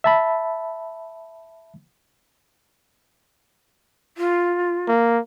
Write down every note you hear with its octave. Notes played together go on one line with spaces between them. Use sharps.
E5 A5 B5
F4
A#3